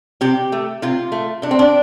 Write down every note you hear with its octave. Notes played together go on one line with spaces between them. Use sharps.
C3 G4
A3
C3 F4
A3
C3 D4
C4
D4